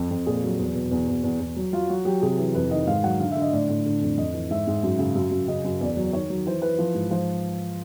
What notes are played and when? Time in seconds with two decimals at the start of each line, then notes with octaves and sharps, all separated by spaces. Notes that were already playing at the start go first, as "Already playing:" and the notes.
Already playing: F2
0.11 F2
0.26 A#2 G#4
0.43 F#3
0.59 E2
0.75 B2
0.91 E2
1.08 E2
1.24 E2
1.40 E2
1.56 F#3
1.73 F#3 F4
1.89 F#3 F#4
2.05 F#3 G4
2.22 C3 G#4
2.38 E3
2.55 F2 B4
2.71 D#3 D#5
2.87 G#2 F5
3.03 F#3 F#5
3.19 D3 F5
3.31 D3 E5
3.41 D#5
3.53 A2 D5
3.69 A2
3.85 D3
4.01 F2
4.17 F2 D#5
4.33 E3
4.50 G#2 E5
4.67 G#2
4.83 F#2
4.99 C#3
5.15 F#2
5.31 F#2
5.48 C#3 D#5
5.64 F#2
5.81 E2 D5
5.97 F#3
6.13 D#3 C#5
6.30 F#3
6.46 E3 C5
6.62 E3 B4
6.79 F3
6.94 G#2
7.11 F3 C5